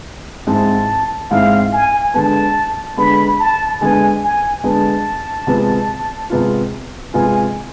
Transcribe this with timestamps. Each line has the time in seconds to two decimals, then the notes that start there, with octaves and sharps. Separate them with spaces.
0.47 G#2 G#3 C4 E4 A5
1.31 G#2 G#3 C4 E4 F5
1.73 G#5
2.14 D3 G#3 B3 A5
2.97 D3 G#3 B3 B5
3.39 A5
3.81 D3 G#3 B3 G#5
4.23 G#5
4.64 D3 G#3 B3 A5
5.47 C3 G#3 B3 F4
6.30 C3 G#3 B3 F4
7.14 C3 G#3 B3 F4 G#5